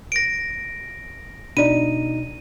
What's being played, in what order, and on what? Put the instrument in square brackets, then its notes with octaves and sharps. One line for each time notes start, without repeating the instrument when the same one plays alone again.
[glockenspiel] A#6 D7
[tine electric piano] B2 D#4 [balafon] D4 D5 [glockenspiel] D#7